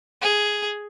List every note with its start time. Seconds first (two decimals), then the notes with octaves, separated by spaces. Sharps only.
0.22 G#4